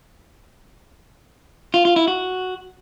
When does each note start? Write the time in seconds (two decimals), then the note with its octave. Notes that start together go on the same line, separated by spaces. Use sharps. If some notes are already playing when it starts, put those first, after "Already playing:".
1.74 F4
1.85 F4
1.96 E4
2.08 F#4